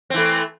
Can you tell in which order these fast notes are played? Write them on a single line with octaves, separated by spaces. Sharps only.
C4 E3 A3